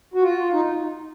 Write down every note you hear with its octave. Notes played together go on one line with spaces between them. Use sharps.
F#4
F4
D#4